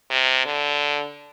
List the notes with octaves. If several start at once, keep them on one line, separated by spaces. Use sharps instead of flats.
C3
D3